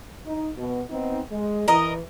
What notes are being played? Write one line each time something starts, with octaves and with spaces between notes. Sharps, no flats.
D#4
B2
B3 C4 D#4
G#3
E3 A#4 D#5